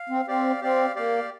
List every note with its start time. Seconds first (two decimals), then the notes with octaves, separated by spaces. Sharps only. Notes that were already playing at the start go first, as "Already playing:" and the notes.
Already playing: F5
0.09 C4
0.28 C4 G4 D5 F5
0.61 C4 G4 D5 F5
0.96 A#3 G4 D5 F5